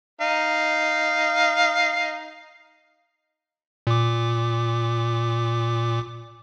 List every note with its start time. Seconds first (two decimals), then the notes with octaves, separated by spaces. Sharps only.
0.21 D#4 F5
3.87 A#2 D6